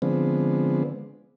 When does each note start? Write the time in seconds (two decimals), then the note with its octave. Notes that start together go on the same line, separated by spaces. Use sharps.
0.02 D3 F3 G#3 B3 C4